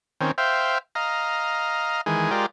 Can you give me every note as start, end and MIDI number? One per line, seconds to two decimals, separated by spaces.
0.21 0.31 51
0.21 0.31 60
0.21 0.31 61
0.38 0.78 72
0.38 0.78 76
0.38 0.78 77
0.38 0.78 79
0.95 2.01 75
0.95 2.01 77
0.95 2.01 82
2.06 2.31 51
2.06 2.31 52
2.06 2.31 56
2.06 2.31 68
2.31 2.46 56
2.31 2.46 65
2.31 2.46 67
2.31 2.46 70
2.31 2.46 74